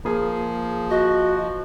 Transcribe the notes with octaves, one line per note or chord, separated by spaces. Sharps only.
F3 A#3 G#4
F#4 D#5